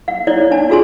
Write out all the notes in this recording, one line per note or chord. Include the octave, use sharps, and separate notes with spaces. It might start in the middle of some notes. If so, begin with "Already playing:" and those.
F5
E4 C#5 D5
D4 A5
F4 F#4 G#4 G#5 A5 C6